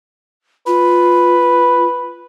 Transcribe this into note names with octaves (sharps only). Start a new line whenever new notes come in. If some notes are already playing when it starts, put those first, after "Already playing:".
F4 B4